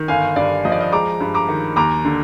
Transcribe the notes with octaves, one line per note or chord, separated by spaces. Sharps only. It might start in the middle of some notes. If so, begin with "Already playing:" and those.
Already playing: D#3
G1 F5 G#5
G2 D5
F3 D#5
D5
D#5
G#3 A#5 D6
G2
A#5 D6
D#3
D#2 A#5 D6
D3